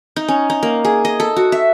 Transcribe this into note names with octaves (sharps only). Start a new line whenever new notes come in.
D#4
C#4
D#4
A#3
G#4
D#5
A4
F#4
E5